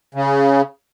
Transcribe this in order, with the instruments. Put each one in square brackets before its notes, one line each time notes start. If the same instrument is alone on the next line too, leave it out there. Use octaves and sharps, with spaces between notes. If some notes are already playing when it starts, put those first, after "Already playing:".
[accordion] C#3